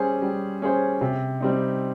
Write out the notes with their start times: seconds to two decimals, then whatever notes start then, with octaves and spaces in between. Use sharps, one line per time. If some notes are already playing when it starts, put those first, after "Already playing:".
Already playing: G3 C#4 G#4 C5
0.22 G3
0.62 C#4 G#4 C5
1.01 C3
1.40 G3 C4 D#4